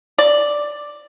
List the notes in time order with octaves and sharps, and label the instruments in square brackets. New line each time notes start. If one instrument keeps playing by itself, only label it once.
[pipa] D5